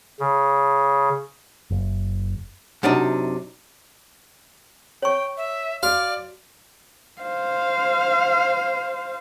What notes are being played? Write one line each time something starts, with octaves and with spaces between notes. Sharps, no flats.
C#3
F#1
F#2 C3 D4 D#4
C#5 G5 C#6
E5
F#4 D5 F5
C5 F5